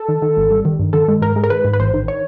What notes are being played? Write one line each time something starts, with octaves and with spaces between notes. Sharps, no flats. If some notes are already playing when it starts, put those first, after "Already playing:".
Already playing: A4
D#3
D#3
G#1
G3
D#3
G2
D#3 A4
G#3
G#2 A#4
G#3
A#4
D#3 B4
G#2
B4
A1 C5
D#3
C#5